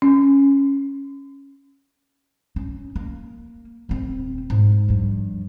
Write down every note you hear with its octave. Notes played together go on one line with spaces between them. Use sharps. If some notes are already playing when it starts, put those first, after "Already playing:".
C#4
C#4
A#3
D#1 C4
G#2
G2 F3